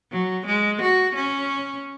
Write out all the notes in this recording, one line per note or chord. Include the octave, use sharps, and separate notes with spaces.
F#3
G#3
F#4
C#4